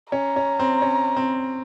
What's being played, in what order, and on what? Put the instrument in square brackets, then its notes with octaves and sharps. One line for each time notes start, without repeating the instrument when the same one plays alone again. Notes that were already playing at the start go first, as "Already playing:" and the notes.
[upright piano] C#4 [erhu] A#5
[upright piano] C#4
C4
C#4
C4